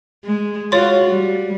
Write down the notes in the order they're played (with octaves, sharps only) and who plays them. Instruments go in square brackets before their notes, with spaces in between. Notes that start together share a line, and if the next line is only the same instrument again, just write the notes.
[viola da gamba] G#3
[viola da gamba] F4 F#4 [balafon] C#5 C6
[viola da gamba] G3